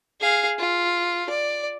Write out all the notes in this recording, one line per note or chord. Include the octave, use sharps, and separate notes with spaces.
G#4 F5
F4
D5